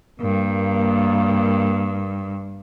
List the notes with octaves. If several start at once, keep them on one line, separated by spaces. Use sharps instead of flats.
G2 A#3